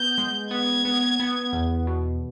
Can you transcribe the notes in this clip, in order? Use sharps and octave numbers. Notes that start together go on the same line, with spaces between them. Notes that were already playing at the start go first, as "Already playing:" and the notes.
Already playing: B3 G6
G#3
B3 G#6
B3
B3
E2
B2